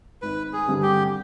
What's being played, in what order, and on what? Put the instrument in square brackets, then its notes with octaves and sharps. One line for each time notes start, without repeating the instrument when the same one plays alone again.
[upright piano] G#1 [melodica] B4
[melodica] G#4
[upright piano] G2 D3 G3 C4
[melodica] G4